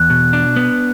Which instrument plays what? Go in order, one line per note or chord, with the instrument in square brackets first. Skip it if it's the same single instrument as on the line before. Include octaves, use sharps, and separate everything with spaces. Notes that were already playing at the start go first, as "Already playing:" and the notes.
Already playing: [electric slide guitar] E2 [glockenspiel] F#6
[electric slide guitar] B2
D4
B3